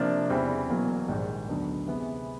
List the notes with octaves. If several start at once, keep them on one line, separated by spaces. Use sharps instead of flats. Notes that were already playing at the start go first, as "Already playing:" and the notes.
Already playing: C3 F3 A#3 D4 F4
E2 C#3 E3 G3 C4
E1 E2 B2 F#3 A#3
A#1 G#2 D#3 G3
D2 D3 F#3 B3 D#4
C3 E3 G#3 B3